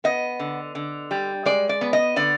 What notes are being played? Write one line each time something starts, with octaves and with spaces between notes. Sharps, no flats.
B3 D#5
D3
D3
G3
G#3 D5
D5
B3
D#5
D3 D5